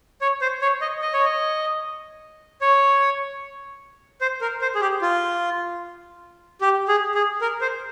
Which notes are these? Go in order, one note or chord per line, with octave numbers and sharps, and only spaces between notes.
C#5
C5
C#5
D#5
D#5
C#5
D#5
C#5
C5
A#4
C5
G#4
G4
F4
G4
G#4
G#4
A#4
C5